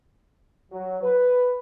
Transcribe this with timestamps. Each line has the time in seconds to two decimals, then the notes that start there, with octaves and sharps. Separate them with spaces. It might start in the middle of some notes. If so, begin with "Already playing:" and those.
0.72 F#3
1.02 B4